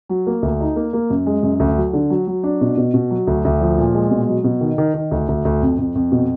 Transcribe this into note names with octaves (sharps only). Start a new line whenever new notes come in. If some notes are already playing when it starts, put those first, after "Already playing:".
F#3
A#3
D2
D#4
A#3
A#3
F#2
G#3
F#2
D2
F#3
D3
F#3
F#3
D4
B2
B2
B2
F#3
D2
D2
F3
A#2
G#3
B2
F#3
B2
D#3
D#3
D#3
D2
D2
D2
F2
F2
F2
B2